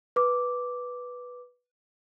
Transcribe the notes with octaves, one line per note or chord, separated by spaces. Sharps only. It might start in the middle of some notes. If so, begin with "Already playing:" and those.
B4 D6